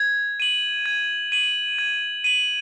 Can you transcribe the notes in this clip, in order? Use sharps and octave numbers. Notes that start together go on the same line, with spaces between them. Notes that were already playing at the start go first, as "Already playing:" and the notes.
Already playing: G#6
D#7 F#7
G#6
D#7 F#7
G#6
D#7 F#7